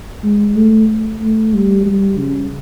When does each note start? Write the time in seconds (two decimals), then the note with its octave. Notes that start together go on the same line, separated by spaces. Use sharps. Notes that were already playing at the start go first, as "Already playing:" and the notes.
0.23 G#3
0.56 A3
1.21 A3
1.54 G3
1.86 G3
2.18 C#3